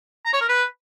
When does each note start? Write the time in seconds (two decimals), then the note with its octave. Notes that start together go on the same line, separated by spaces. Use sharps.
0.25 A#5
0.33 C#5
0.41 A#4
0.49 B4